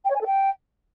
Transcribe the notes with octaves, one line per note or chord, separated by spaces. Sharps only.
G5
C#5
G#5
A4
G5